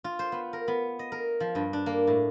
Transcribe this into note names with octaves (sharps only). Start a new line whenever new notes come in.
F4
C5
B3
A#4
B3
D#5
A#4
F3
G2
D4
A#3
A2